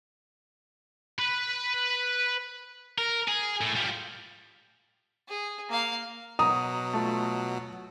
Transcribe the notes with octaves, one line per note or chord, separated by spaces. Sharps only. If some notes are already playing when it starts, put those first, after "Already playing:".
B4 B5
A#4
G#4
A2
F3 G3
G#4
A#3 F5
B2 F#3 A#5 D#6
A3 F4